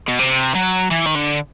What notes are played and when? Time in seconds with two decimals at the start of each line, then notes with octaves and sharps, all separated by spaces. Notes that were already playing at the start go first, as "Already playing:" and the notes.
0.08 B2
0.19 C3
0.55 F#3
0.91 E3
1.06 D#3
1.15 D3